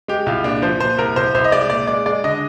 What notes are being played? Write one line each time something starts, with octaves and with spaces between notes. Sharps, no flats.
G#3 G4
C2 F4
A#2 D4
F3 C5
A#2 C5
C2 A#4
C2 C5
C2 C5
D#5
G#3 D5
A#2 D5
G#3 D5
G#3 D5
D3 D#5